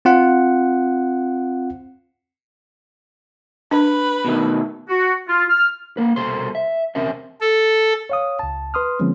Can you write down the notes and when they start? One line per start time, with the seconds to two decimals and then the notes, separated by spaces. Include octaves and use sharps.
0.05 C4 F4 F#5
3.71 D4 B4
4.25 B2 D#3 A3
4.89 F#4
5.28 F4
5.49 F6
5.97 A#3 B4
6.16 C2 B2 A4 C5 C6
6.55 E5
6.95 E2 C3 C4 C#4 A#4 E5
7.41 A4
8.10 C#5 F5 D#6
8.39 C#2 A5
8.74 B4 C6 D#6 F6
9.00 D3 F3 G#3 A#3 C4 C#4